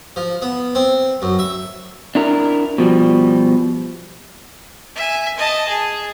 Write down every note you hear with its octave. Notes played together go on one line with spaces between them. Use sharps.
F3
B3
C4
F#2
E5
D4 E4 A#4
B2 F3 G3
E5 G#5
D#5 A5
G#4